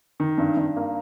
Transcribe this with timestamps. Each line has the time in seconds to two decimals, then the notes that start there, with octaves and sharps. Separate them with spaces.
0.20 D#3
0.38 G2
0.57 G2
0.76 A#3